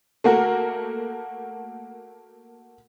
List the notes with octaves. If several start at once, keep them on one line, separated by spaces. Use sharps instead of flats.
A3 A#3 F#4 A#4